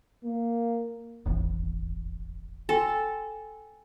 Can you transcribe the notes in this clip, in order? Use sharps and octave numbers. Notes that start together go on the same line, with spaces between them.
A#3
D#1 G#1 E2
A4 G5 G#5 C6